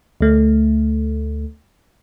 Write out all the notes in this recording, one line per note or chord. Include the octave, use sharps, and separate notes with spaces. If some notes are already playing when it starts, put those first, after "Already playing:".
D2 A3